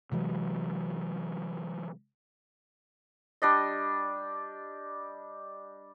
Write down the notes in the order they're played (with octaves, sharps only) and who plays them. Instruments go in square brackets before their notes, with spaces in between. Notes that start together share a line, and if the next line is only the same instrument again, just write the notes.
[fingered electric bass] C3 E3 F#3 G#3
[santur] G3 D4 D#5